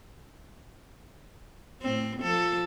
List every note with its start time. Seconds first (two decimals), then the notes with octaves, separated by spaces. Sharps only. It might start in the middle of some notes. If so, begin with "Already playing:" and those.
1.82 A2 C4
2.20 F3 A4